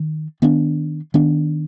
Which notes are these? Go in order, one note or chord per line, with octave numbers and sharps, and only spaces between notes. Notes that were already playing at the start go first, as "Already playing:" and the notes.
Already playing: D#3
D#3 B3 D4
D#3 B3 D4